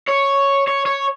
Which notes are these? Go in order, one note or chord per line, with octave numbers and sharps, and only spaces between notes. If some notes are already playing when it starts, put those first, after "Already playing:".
C#5
C#5
C#5